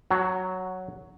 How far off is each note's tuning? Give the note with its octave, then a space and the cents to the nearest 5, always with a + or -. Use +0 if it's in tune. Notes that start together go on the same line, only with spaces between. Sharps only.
F#3 +0 F#4 +0 A#5 -45